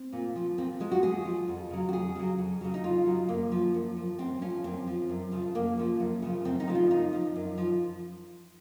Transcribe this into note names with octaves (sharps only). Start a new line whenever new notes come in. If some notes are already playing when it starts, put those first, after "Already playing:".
Already playing: C4
A#2
F3
A#2 C4
F3 G#3
F#4
A#2 G#4
F3
F2
C#3 F#3
F#4
F2 G#4
C#3 F#3
F2
C#3 F#3
D#4
F2 F4
C#3 F#3
F#2 A#3
F3
F#2
F3
F#2 C4
F3 C#4
F#2 C4
F3
F#2
C#3 F3
F#2 A#3
C#3 F3
F#2
C#3 F3
F#2 C4
D#4
C#3 F3
F4
F#2 D#4
F3
F#2
F3